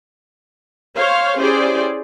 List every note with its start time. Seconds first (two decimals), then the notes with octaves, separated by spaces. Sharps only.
0.95 C5 C#5 F5
1.37 C#4 E4 G4 G#4 C5 D5